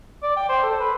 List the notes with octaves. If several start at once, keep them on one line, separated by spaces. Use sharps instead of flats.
D5
G5
C5
A4
B4